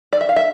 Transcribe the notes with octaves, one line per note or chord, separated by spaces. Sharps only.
D5
E5
F5
E5